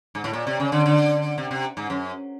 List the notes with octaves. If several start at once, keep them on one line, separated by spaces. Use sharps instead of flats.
G#2
A2
A#2
C3
C#3
D3
D3
C3
C3
G#2
F#2